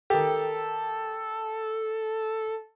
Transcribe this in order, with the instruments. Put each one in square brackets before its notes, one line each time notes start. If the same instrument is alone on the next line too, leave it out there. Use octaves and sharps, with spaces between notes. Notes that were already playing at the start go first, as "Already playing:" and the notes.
[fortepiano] D#3 G4 [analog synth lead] A4